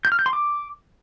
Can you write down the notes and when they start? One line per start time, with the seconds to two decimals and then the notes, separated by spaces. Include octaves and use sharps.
0.05 G6
0.12 F6
0.19 G6
0.26 C6
0.33 D6